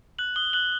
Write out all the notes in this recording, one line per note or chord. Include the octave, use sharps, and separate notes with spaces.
F#6 F#7
D#6 G7
F#6 F#7